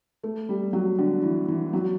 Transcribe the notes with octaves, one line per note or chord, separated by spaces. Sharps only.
A3
G3
F#3
D3
E3
E3
F#3